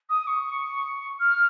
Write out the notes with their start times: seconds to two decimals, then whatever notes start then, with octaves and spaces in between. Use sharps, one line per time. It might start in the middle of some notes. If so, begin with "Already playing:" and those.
0.09 D#6
0.26 C#6
1.19 F6